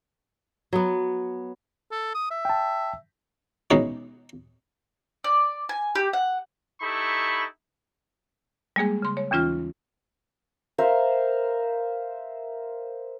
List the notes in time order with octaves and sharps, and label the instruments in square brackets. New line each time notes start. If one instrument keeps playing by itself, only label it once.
[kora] F#3 B3
[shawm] A4
D#6
E5
[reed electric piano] G5 A5
[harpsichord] B2 E3 G#3 C#4 D#4 F#4
[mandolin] D5
G#5
G4
F#5
[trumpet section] D#4 E4 G4 A4 B5 C#6
[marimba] G3 G#3 A#3 G#4 G#5
C#3 C6
C#5
D#2 E3 C#4 F4 F6
[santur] A#4 C5 E5 F5